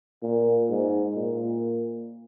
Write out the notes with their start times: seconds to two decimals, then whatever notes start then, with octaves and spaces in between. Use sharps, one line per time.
0.22 A#2
0.69 G#2
1.15 A#2